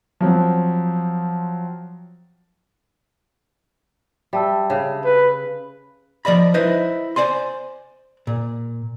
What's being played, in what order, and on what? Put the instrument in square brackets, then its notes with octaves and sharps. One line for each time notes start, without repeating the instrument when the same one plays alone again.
[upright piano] F3 F#3 C4
[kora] G3 [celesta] E5 A5 E6
[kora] C#3
[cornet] B4
[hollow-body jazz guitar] F3 D5 D#5 B5
D#4 E4 B4 C5 D#5
C5 D5 G#5 C6
A#2